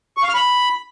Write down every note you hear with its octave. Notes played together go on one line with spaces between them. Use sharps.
C#6
F5
F6
B5